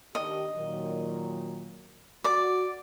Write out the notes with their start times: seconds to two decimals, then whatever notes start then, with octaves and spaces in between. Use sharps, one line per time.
0.15 D#3 D4 G4 D#5
0.57 A#2 D#3 F#3
2.24 F#4 D5 D6